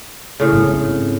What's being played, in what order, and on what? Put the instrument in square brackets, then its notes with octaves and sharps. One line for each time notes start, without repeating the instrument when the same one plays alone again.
[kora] A2 C#3
[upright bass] G#2 C4